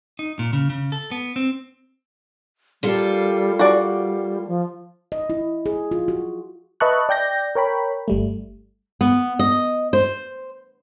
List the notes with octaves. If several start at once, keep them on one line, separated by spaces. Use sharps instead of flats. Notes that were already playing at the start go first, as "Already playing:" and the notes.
D#4
A#2
C#3
C#3
A4
B3
C4
G3 A#3 F4 A4
G3 F#4 D5
F3
D#5
E4
G#4
F4
F#4
B4 D#5 E5 A5 C#6 F#6
D5 G5 G6 A#6
A#4 C#5 G5 B5
G1 G3 A3
B3
D#5
C5